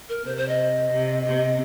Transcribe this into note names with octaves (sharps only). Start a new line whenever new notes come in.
A#4
C3 C5
C5
D#5
C3
C3 D#5